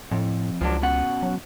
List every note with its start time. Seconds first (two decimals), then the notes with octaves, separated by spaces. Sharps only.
0.11 F2 A2
0.61 C#2 F3 F#3 D4
0.82 B2 C#4 F#5
1.23 F#3